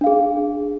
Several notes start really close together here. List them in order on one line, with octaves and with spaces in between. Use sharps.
D4 F5 G#4